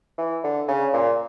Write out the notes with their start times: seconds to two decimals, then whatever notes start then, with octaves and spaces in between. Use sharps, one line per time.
0.18 E3
0.44 D3
0.68 C#3
0.94 A#2